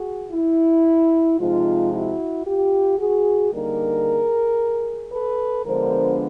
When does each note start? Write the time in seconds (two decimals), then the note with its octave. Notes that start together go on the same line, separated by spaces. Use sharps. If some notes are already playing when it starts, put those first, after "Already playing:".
Already playing: F#4 G#4
0.32 E4
1.39 C3 F3 G#3 D#4 F4
1.92 E4 F#4
2.45 F4 G4
2.98 F#4 G#4
3.52 D3 G3 A#3 D#4 G#4 A#4
5.12 A4 B4
5.66 D3 F3 G#3 B3 D4 A#4 C5